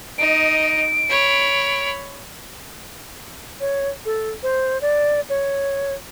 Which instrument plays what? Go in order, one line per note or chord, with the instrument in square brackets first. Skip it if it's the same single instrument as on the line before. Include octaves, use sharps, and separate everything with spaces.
[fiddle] D#4 D#5 [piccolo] D7
[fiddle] C#5 B5
[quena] C#5
A4
C5
D5
C#5